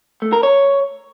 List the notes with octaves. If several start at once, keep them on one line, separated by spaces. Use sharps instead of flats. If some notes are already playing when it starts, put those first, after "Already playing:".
A3
A#4
C#5